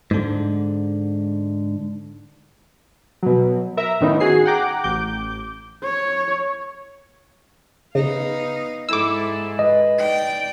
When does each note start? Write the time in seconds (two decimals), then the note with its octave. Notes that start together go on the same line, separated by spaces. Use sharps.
0.11 G#2 D3
3.23 B2 F#3
3.77 A#4 E5 A#5
4.01 A2 D#3 B3 C#4 D#4 E4
4.20 F#4 G#4 C7
4.45 F#5 G5 A#5 D6
4.84 A1 D6 G6
5.84 C#5
7.95 C#3 B3 D#4 F5
8.89 G#2 E4 A4 D6 E6
9.59 B4 D#5
9.98 D#4 D5 G5